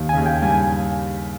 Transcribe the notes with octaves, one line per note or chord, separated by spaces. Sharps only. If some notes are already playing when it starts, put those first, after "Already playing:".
Already playing: D#2 D#3
C#3 G#5
D#2 D#3
G5
G2 G3 G#5